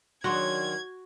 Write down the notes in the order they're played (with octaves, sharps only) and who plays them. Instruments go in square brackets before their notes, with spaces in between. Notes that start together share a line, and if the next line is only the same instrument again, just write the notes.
[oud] D#3 F#3 D4 [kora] F#4 [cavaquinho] G#4 G5 C6 [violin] G#6